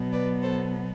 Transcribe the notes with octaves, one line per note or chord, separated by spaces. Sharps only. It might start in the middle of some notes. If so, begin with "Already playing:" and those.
Already playing: B2 F#3 B3
B4 D5
A4 C5